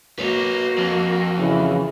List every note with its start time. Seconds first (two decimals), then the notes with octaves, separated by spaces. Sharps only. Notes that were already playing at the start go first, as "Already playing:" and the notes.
0.19 A#3 F#4 B4 C#5
0.78 F2
1.38 C#3 E3